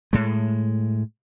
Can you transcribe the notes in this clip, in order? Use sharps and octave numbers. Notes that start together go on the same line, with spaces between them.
A2 G#3